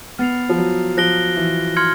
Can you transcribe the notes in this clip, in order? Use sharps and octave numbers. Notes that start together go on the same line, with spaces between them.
B3 F6 A6 C7 F7
F3
F#3
F3 F#6 A#6 D7 G7
E3
C6 F6 G#6 C#7